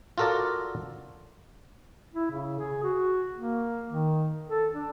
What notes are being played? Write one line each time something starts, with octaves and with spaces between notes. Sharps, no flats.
F4 F#4 A4 A#4 D5
E4
C#3
G#4
F#4
A#3
D#3
A4
D4